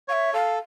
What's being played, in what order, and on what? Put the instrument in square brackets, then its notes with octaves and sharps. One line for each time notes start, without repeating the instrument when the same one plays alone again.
[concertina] C#5 [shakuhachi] F5
[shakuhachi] E5
[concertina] A4 [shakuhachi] F5